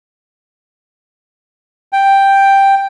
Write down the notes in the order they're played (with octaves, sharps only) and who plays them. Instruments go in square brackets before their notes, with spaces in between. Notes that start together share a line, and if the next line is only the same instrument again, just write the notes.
[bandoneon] G5